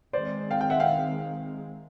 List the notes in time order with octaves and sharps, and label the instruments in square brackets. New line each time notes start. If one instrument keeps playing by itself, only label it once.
[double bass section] D#3 G#3 C4 [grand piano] C5 D5
[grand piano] F5 G5
F5 G5
E5 F#5
F5 G5